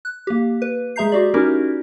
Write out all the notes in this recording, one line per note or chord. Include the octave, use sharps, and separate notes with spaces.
F#6
A#3 G4
B4
G#3 G#4 E5 A#5 G6 C7
F#4 G4 D5
C#4 D#4 E4 F#4 G4 A#4